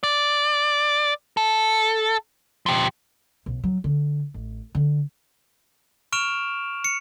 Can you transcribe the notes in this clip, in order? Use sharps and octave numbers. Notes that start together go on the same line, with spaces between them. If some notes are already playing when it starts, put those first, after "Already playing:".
D5
A4
F3 G4
B1
F#3
D3
A1
D3
C#6 F6 D7 E7 F7
C#7